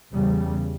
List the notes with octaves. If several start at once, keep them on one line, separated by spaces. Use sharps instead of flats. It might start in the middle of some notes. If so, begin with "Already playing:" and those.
E2 C#3 G3